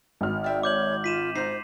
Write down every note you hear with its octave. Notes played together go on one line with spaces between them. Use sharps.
G#1 F6
D5 E5 G5
C#5 D6 G6 F#7
F4 B6 D#7 E7
D#4 F4 C5 C7